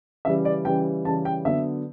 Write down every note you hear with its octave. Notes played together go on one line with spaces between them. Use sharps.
C#3 E3 G3 E5
D5
C#3 E3 G3 G5
C#3 E3 G3 A5
G5
D3 F#3 B3 E5